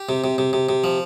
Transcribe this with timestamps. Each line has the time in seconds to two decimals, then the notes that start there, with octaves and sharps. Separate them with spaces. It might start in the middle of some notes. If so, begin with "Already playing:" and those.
Already playing: G4
0.09 C3
0.24 C3
0.38 C3
0.53 C3
0.69 C3
0.84 F3